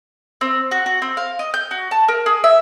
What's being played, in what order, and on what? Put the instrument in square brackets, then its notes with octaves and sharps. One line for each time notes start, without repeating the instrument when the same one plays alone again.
[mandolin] C4
F#4
F#4
C4
F5
D#5
G6
F#4
A5
A#4
G#4
E5